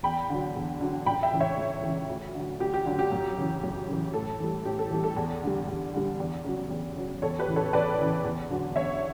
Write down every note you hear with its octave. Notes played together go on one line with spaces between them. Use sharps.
E2 G5 B5
D3 F#3
E2
D3 F#3
C#2 G5 B5
E5 G5
C#3 E3
C#5 E5
C#2
C#3 E3
D2
D3 F#3
D2 G4
G4
D3 F#3
G4
F#2
C#3 E3
F#2
C#3 E3
A2 A4
E3 G3
A2 G4
A4
E3 G3
A4
E2
D3 G3
E2
D3 G3
E2
C#3 F#3
E2
C#3 F#3
E2 A4 C#5
G4 B4
C#3 E3
A4 C#5
E2 B4 D5
C#3 E3
E2
D3 F#3
E2 C#5 E5